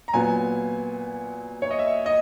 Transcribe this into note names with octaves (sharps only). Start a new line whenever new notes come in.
A#5
A#2 F#3 B3 G#5
C#5
D#5
E5
D#5